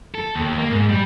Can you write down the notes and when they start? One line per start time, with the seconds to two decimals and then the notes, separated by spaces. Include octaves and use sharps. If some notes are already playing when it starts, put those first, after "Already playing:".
0.15 A4
0.36 D#2
0.58 A#3
0.71 G#2
0.89 G3